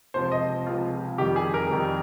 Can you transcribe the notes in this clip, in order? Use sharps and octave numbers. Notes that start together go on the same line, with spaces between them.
C#2 C3 F3 C5
D#5
C#2 C3 F3 F4
F2 D#3 G3 G4
G#4
A#4
F2 D#3 G3